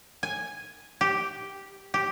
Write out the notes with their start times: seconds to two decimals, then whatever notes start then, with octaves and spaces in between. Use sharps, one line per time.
0.23 G#5
1.01 G4
1.94 G4